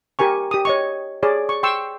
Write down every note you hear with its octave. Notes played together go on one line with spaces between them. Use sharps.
G4 A#4 G#5 C#6
G4 D#6
C#5 D#5 C#6
G#4 C#5 D5
C#6
G5 C6 C#6 E6